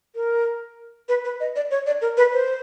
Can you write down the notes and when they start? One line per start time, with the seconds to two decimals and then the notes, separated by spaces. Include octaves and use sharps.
0.15 A#4
1.09 B4
1.25 B4
1.40 D#5
1.56 D5
1.71 C#5
1.87 D5
2.02 A#4
2.17 B4
2.33 C5